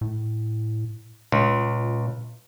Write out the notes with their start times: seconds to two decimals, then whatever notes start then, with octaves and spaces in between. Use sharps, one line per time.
0.01 A2
1.32 C#2 A#2